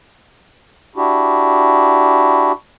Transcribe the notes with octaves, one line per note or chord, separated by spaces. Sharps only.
D4 E4 F#4 G4